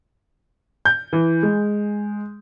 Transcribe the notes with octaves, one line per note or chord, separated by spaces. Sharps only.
G6
E3
G#3